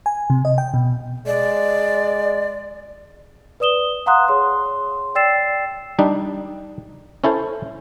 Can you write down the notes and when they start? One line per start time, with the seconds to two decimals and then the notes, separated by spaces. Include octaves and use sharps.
0.06 G#5
0.30 C3
0.45 D#5
0.58 G5
0.74 B2
1.26 G#3 D5
3.60 B4 D5 D#6 E7 G7
4.06 F5 F#5 A#5 C6 D#6 F#6
4.28 G#4 C#5 C6
5.15 D5 G5 E6 A6 C7 E7
5.99 G3 D4 D#4
7.24 C#4 E4 A4 C5